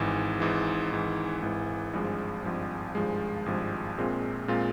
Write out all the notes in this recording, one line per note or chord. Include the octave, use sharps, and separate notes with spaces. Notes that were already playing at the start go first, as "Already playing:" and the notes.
Already playing: G#1 G#2 E3
G#1 G#2 E3
G#1 G#2 E3
G#1 G#2 E3
G#1 G2 F3 G#3
G#1 G2 F3 G#3
G#1 G2 F3 G#3
G#1 G2 F3 G#3
A#1 A#2 G#3 C4 F4
A#2 G#3 C4 F4